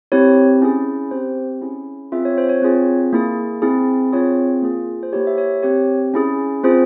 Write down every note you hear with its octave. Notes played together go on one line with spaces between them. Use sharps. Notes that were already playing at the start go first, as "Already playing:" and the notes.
C4 E4 G4 C#5
C#4 E4 G#4
C4 G4 C5
C#4 E4 G#4
C4 F4 G#4 E5
C#5
C5
C#5
C4 F4 G#4
A#3 E4 G#4
C4 E4 G#4
C4 F4 G#4 C#5
A#3 F4 G#4
C5
A#3 E4 G4 C#5
E5
C#5
C4 G4 C#5
C#4 E4 G#4
C4 F4 G#4 C5